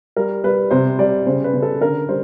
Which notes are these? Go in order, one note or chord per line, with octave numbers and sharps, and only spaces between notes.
G3 A#4
G3 B4
C3 C5
G3 D5
C#3 C5
B4
C#3
A4
D3 A#4
G3 C5